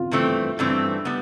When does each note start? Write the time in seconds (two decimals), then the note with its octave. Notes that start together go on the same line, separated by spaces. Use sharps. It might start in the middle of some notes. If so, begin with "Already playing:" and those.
Already playing: F4
0.11 G2 E3 A3 C4
0.59 G2 E3 A3 C4
1.05 G3 B3